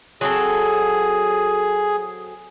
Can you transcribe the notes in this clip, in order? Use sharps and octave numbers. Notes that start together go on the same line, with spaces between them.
F#3 C4 G#4 A4